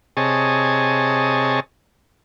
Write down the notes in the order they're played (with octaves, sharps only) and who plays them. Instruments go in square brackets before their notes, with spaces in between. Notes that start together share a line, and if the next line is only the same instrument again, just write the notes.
[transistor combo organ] C3 G#4 C#5 D#5 A5